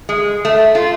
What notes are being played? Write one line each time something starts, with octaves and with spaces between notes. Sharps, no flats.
G#3
A3
F4